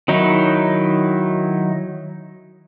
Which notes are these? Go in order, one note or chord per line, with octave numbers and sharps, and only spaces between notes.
D#3 F#3 D#4 E4